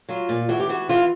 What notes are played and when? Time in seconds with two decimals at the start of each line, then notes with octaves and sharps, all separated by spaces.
0.09 F#3 F4
0.29 A#2
0.49 E3 F#4
0.60 G4
0.69 E3 F#4
0.89 E3 F4